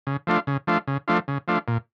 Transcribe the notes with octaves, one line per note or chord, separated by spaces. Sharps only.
C#3
F3 A3 D4 F4
C#3
F3 A3 D4 F4
C#3
F3 A3 D4 F4
C#3
F3 A3 D4 F4
A#2